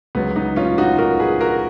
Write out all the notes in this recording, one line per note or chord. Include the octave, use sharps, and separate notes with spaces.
C#2 C#3 F#3 B3
B3 D#4
C#4 F4
D#4 F#4
F#4 A#4
G#4 B4
F#4 A#4